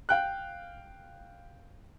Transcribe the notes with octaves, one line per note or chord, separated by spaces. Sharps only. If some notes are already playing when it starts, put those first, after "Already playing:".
F5 G5 F#6